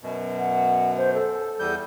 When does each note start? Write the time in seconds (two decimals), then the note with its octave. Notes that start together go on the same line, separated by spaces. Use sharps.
0.01 F#2 B2
0.39 F#5
0.97 C5
1.14 A4
1.60 E2 G3 G6